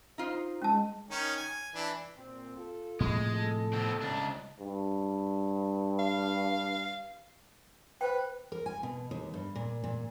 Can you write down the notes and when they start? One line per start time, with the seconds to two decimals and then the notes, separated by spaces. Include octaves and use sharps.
0.18 D#4 F4 C5
0.62 G#3 C#4 A5
1.11 D#3 C#4 D#4
1.36 G#5
1.75 E3 D4
2.17 A#2 C4
2.56 F4 A4
3.00 A2 C3 F3 G#3
3.34 A4
3.73 B2 C4
4.01 C#2 D4
4.60 G2
5.99 F5
8.01 B4 C5 G5
8.52 A#4
8.66 G#5
8.83 B2
9.11 D#2
9.34 G2
9.56 A#2
9.84 A#2